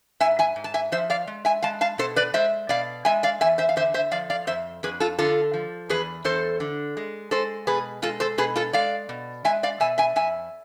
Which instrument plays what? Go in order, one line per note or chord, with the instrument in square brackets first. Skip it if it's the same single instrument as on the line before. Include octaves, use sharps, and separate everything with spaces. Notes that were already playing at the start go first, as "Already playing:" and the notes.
[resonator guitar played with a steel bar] G#2 E5 G#5
E5 G#5
G#2
A5
E5 G#5
F3 C5 E5
D5 F5
G#3
E5 G#5
G#3 F5 A5
F5 A5
B2 A4 C5
B4 D5
G#3 C5 E5
B2 D5 F5
G#3 E5 G#5
D5 F5
E2 E5 G#5
C5 E5
F5
D3 C5 E5
C5 E5
F3 D5 F5
D5 F5
F2 C5 E5
F2 G#4 B4
F4 A4
D3 F4 A4
F3
E2 G#4 B4
E2 A4 C5
D3
G#3
G#3 A4 C5
B2 G#4 B4
G#3 F4 A4
A4 C5
B2 G#4 B4
F4 A4
G#3 D5 F5
B2
G#3 E5 G#5
D5 F5
B2 E5 G#5
E5 G#5
F2 E5 G#5